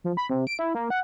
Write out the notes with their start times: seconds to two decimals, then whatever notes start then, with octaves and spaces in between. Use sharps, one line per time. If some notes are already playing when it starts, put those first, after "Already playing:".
0.04 F3
0.17 B5
0.29 C3
0.47 D7
0.59 E4
0.75 A#3
0.90 F#5